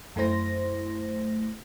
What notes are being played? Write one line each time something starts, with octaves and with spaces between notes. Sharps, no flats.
F#2 A3 E4 C5 A#6